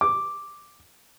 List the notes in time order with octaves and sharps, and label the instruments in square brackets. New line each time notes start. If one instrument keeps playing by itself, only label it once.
[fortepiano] D6